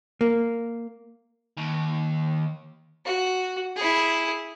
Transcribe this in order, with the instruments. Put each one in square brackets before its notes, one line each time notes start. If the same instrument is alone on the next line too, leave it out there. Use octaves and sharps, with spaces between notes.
[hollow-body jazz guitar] A#3
[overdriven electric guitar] D#2
[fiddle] F#4
E4 G#4